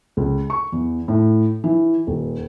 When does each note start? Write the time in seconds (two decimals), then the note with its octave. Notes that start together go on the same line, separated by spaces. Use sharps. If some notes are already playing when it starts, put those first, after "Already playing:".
0.17 C#2
0.50 C#6
0.72 E2
1.08 A2
1.64 E3
2.07 D#1